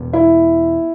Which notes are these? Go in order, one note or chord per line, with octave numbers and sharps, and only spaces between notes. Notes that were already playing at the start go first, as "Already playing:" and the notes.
Already playing: E1 E2 B2 B3
E4